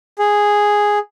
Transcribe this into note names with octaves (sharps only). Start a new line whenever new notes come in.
G#4